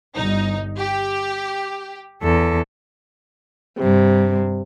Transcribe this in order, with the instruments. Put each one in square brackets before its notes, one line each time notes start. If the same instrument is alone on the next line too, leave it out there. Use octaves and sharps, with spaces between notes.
[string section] G1 D#4
G4
[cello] E2 A4
[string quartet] G2 C3